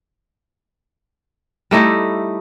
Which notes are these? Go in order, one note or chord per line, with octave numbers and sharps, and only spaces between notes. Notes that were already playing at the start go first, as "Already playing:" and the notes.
G3 A3 D#4 E4